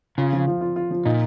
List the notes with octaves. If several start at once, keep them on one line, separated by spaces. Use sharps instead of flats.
C#3 F4
F3
F3
F4
F4
F3
A#2 D#4